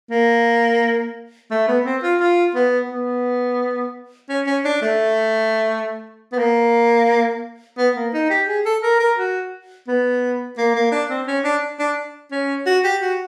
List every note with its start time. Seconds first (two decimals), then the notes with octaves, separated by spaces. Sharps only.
0.11 A#3
1.51 A3
1.68 B3
1.85 C4
2.03 F4
2.20 F4
2.55 B3
2.90 B3
4.29 C#4
4.47 C#4
4.65 D4
4.82 A3
6.32 B3
6.39 A#3
7.78 B3
7.96 A#3
8.14 D#4
8.30 G4
8.48 G#4
8.66 A4
8.83 A#4
9.00 A#4
9.18 F#4
9.88 B3
10.58 A#3
10.74 A#3
10.92 D4
11.10 C4
11.27 C#4
11.44 D4
11.80 D4
12.31 C#4
12.66 F#4
12.84 G4
13.02 F#4